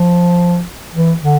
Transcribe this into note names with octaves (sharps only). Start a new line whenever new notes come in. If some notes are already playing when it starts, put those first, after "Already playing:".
Already playing: F3
E3
D3